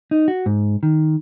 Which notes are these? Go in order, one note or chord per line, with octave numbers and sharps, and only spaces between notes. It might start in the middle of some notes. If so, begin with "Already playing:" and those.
D#4
F#4
G#2
D#3